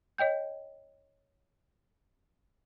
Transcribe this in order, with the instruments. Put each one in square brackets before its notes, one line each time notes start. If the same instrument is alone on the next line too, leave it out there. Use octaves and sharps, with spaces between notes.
[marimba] C#5 D#5 G5 G6